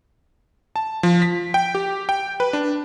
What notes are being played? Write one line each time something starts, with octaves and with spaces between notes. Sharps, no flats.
A5
F3
B6
G5
G4
G5
B4
D4